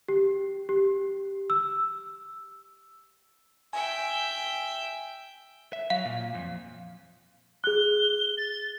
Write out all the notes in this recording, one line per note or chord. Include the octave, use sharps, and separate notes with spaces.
G4
G4
E6
E5 G5 G#5
E5
F#3 F5
A#2
F2
G#4 F#6 G7
A6